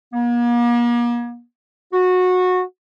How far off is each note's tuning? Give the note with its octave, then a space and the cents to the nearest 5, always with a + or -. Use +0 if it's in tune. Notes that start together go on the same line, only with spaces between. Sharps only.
A#3 +40
F#4 -20